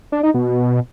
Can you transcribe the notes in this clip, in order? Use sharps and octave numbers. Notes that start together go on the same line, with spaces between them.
D4
D#4
B2